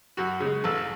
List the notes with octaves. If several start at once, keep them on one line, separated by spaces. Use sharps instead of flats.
F#2 F#4
C#3 G#3
A1 A4